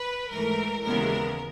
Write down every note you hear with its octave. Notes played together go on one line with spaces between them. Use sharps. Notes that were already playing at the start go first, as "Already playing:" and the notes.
Already playing: B4
G#2 E3 A3 A#4
D#2 C#3 E3 G#3 B3 A#4